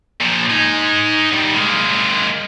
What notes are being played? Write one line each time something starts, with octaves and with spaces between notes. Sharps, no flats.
A#2 F3
D#4 G#5
D#3 G3
G#3 A#3